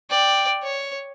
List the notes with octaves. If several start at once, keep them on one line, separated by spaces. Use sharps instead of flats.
D5 G5
C#5